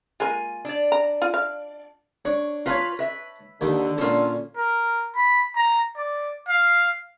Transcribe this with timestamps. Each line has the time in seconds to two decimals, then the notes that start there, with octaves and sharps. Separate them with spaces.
0.20 G#3 A#3 F4 G#5
0.65 D4 D5
0.92 A#5
1.22 F4
1.34 F5
2.25 D4 C#5
2.66 F4 B4 C#5 F5 A5 A#5
2.99 B4 E5
3.61 D#2 D3 D#3
3.98 A#2 C#4 F4 A4
4.57 A#4
5.15 B5
5.56 A#5
5.97 D5
6.48 F5